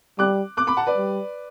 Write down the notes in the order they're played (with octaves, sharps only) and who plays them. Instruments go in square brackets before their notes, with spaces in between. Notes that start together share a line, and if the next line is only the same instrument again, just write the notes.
[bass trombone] G3 [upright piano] D6 F#6
[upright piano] D6 F#6
B5 D6
F#5 A5
B4 D5
[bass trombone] G3